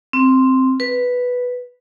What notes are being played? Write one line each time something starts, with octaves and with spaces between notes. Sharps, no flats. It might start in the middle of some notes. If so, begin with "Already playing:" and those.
C4
B4